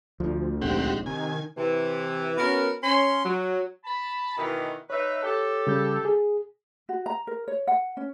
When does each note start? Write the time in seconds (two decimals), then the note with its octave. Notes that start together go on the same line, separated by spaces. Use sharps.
0.20 D2 F3
0.62 D#1 A#1 G#2 C4 G4 F#5
1.06 C3 D#3 G#5
1.57 C3 E3
2.38 B3 C#4 F#4 A#4
2.84 C#4 C6
3.24 F#3
3.84 A5 B5
4.38 B2 D#3 E3
4.90 D#4 B4 C#5 E5
5.23 G4 A4
5.67 C#3 G3 G6
6.05 G#4
6.89 F#4
7.06 A#5
7.27 A#4
7.48 C#5
7.67 F#5
7.97 C#4